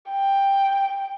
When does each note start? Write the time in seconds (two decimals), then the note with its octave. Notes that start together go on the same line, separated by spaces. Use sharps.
0.11 G5